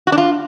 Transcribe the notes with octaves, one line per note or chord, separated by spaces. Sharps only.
F#4
D4
F4